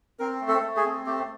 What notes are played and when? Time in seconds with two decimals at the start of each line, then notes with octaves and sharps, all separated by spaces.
0.19 C4 A#4
0.41 A3
0.48 A4
0.63 A3
0.76 G#4
0.85 C4
1.06 A3 G4